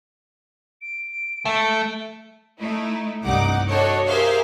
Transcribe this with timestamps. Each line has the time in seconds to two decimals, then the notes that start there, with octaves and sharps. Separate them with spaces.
0.82 D7
1.45 A3
2.59 A3 D#4 E4
3.22 C2 G2 D#4 F#5 D6
3.69 D4 F#4 A4 C#5 D#5
4.08 G4 G#4 A#4 C5 E5 F5